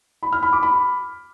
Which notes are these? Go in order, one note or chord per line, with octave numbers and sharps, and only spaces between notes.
B5
F6
B5
D6
B5